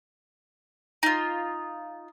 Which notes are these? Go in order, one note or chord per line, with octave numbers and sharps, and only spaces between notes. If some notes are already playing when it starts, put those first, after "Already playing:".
D#4 F4